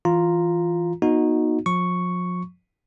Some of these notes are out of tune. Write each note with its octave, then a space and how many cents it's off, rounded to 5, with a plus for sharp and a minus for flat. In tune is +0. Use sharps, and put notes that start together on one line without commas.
E3 +0 F4 +0 A#5 +0
B3 -35 D#4 +0 F#4 -20
F3 +40 C#6 +0